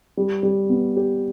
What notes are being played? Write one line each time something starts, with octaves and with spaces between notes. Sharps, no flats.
G3
G3
B3
G4